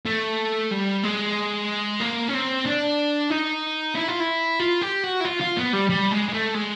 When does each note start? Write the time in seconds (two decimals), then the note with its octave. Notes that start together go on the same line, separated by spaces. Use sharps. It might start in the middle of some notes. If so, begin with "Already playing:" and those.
0.06 A3
0.71 G3
1.03 G#3
2.00 A#3
2.28 C#4
2.34 C4
2.66 D4
3.30 D#4
3.95 E4
4.08 F4
4.20 E4
4.60 F4
4.82 G4
5.03 F#4
5.20 E4
5.25 F4
5.41 F4
5.57 B3
5.73 G3
5.90 G3
6.11 G#3
6.29 G#3
6.33 A3
6.55 G#3